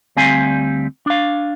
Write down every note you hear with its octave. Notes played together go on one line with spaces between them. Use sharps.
D2 G3 C4 F5 G#5
D4 F5